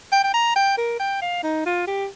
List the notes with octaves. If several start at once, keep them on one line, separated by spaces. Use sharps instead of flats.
G5
G5
A#5
G5
A#4
G5
F5
D#4
F4
G4